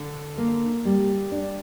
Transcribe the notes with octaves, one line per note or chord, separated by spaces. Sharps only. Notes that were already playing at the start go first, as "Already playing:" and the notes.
Already playing: D3
A#3
G3
D4